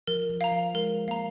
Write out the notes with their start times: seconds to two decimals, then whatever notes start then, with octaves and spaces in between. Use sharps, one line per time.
0.07 F3 A#4
0.30 F3
0.41 F5 A#5
0.52 F3
0.74 G#3 A#4
1.08 A#3 F5 A#5